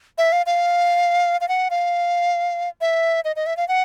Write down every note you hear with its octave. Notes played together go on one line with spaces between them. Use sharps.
E5
F5
F5
F5
F#5
F5
E5
D#5
D#5
E5
F5
F#5